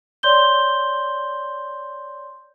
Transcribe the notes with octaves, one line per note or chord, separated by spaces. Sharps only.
C#5 D5 C6 G6 G7